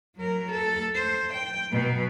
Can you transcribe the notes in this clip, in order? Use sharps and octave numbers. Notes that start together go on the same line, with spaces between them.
F#3 A#4
A4
C5
G5
B2 F#3